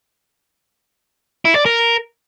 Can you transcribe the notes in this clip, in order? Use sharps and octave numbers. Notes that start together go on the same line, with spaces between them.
E4
D5
A#4